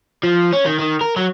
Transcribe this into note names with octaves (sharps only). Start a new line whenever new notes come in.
F3
C#4
D#3
D#3
A#4
F#3